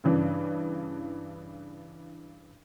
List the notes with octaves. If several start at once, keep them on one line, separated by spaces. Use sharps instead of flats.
G2 C#3 E3 D4